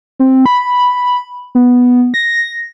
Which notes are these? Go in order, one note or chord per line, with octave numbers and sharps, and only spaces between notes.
C4
B5
B3
A#6